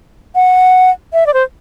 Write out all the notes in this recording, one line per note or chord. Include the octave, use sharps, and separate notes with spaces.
F#5
E5
D5
C5